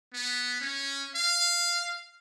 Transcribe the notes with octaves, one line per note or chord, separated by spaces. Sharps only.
B3
C#4
F5